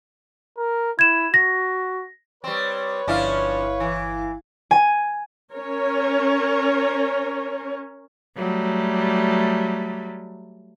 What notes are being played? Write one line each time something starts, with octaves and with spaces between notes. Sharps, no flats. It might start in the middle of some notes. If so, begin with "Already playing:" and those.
A#4
E4 G#6 E7
F#4 A#6
G3 C4 B4 C#5
G1 F3 C#4 D4 E4 F5
E3
G#5
C#4 A#4 C#5
F#3 G3 A3